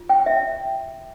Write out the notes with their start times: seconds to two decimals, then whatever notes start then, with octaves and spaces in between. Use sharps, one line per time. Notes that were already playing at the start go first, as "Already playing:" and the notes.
Already playing: F4
0.09 G5
0.26 E5